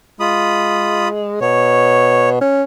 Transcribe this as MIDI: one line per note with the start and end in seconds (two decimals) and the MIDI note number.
0.20 1.39 56
0.20 1.08 65
0.20 1.08 83
0.20 1.08 87
1.41 2.37 47
1.41 2.29 73
2.41 2.63 61